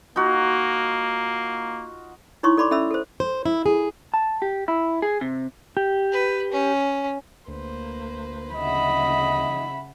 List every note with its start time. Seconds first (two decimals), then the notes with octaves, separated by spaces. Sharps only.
0.16 A#3 D#4 F4 F#4
2.43 D#4 E4 C#5 C6 C#6 D#6
2.57 A4 D5 B5 C6 D6
2.71 C#4 A4 E5 B5 E6
2.91 A4 C5
3.20 C5
3.46 E4
3.66 G#4
4.14 A5
4.42 G4
4.68 E4
5.02 G#4
5.21 C3
5.77 G4
6.12 B4
6.52 C#4
7.48 D2 A#3 B4 C5
8.55 C#3 D#5 E5 F#5 B5